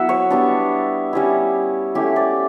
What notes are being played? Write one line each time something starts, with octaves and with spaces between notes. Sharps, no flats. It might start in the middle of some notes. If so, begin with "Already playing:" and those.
Already playing: F#3 B3 E4 E5 F#5
C#5
G3 B3 D4
G3 C#4 E4
A3 C#4 E4 G4
D5